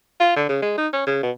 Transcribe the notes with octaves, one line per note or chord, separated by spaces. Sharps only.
F4
D3
C#3
G#3
D#4
C#4
C#3
B2